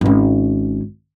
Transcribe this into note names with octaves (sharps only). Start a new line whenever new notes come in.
G#1 C#4